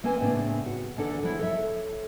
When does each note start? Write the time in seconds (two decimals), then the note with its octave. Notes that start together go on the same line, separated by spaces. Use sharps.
0.04 A#3 C4 C#4 B4 G#5
0.20 A2 C#3 B3 C4 D4
0.66 F#4
0.96 E2 D3 D4 A4 F#5
1.23 F3 F#3 E4
1.39 A4 C#5 E5